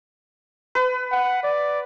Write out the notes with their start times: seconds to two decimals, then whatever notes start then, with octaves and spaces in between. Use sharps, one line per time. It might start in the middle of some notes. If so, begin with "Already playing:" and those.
0.75 B4
1.11 F#5
1.43 D5